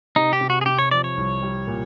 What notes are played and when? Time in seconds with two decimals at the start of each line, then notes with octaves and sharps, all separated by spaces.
0.16 C3 D#4
0.33 G4
0.41 C3
0.50 F#4
0.61 G#4
0.66 C3 G4
0.79 C#5
0.91 F3 D5
1.04 C#5
1.17 C2
1.42 G3
1.67 A#2